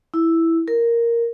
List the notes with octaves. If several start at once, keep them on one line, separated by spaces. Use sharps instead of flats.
E4
A#4